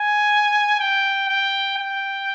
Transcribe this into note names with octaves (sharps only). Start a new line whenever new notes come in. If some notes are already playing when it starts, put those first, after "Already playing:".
Already playing: G#5
G5
G5
G5